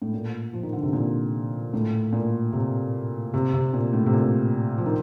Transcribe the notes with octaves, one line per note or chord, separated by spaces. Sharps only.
A2
A#2
F3
D#3
D3
C3
A#2
A2
A#2
C3
C3
C3
A#2
A2
C3
A#2
F3
D#3